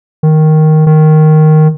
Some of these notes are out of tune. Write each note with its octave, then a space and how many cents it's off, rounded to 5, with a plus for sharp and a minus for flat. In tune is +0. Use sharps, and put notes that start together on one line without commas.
D#3 +0
D#3 -5